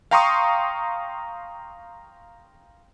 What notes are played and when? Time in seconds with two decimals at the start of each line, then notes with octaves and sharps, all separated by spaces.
0.11 F5 G5 A#5 C6 C#6 D#6